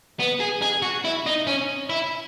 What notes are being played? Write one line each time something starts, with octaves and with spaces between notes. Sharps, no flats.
B3
G#4
G#4
F#4
E4
D#4
C#4
E4